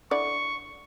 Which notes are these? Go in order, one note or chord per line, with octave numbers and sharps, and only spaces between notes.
D3 E4 D5 C#6